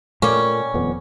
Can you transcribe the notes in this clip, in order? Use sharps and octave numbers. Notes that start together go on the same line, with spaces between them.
A#2 G3 A3 A#3 C#4
D#1 F2 B3